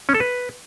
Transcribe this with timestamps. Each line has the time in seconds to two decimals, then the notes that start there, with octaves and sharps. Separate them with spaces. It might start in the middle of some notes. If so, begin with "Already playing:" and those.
0.09 C#4
0.14 A4
0.20 B4